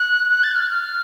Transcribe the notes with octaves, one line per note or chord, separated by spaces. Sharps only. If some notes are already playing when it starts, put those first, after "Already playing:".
Already playing: F#6
F#6
A6
F#6
F6
F6